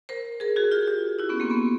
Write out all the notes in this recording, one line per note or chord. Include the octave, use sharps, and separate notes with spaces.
A#4 C5
G#4 A#4
F#4 G#4
F4 G4
F4 G4
E4 F#4
B3 C#4
A#3 C4
B3 C#4